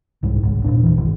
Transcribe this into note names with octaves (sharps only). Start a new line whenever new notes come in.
C2 G#2 G3
G#1 C#2
E1 C2 A#2 D4
E1 B1 E3
G#1